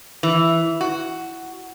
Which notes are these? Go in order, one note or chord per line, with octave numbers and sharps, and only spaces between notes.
E3
F#4